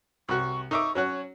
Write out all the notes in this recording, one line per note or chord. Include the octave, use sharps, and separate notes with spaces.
C2 F#4 C#6
D#4 E5 C#6 D6
F#3 C#4 F#4 C#5